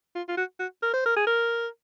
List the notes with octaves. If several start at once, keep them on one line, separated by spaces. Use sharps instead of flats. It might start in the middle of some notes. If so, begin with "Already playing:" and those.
F4
F4
F#4
F#4
A#4
C5
A#4
G#4
A#4